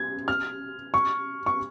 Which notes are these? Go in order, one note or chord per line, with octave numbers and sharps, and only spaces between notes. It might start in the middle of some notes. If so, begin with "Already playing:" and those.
Already playing: G#6
F6
C#6
C#6